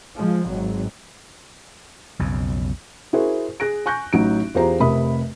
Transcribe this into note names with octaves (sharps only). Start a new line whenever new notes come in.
F3 G#3
G#1 F#3
B1 F2 C#3
E4 F#4 G#4 A#4 C5
G#4 F#6 A#6 D7
G#5 C#6 F#6 G6 A#6
A1 F#3 D#4 D7
E2 F4 G4 G#4 C5 A#5
F1 C3 A#4 E5 B5 D#6